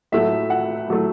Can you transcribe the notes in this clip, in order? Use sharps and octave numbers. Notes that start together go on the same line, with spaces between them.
A2 F#3 A3 E5
F#5
A2 F#3 A3